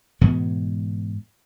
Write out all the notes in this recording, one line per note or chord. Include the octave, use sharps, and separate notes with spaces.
G#2 B2 E3 B3